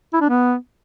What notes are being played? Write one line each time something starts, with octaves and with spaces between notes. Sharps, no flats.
E4
D4
B3